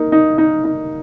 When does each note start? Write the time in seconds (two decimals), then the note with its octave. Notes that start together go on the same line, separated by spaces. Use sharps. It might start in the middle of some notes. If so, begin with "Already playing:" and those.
Already playing: A#3 D#4
0.12 D#4
0.38 D#4
0.64 D#4